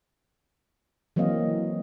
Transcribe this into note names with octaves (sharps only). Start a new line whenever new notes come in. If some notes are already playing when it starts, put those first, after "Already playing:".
E3 F#3 A#3 C4 D#5 F5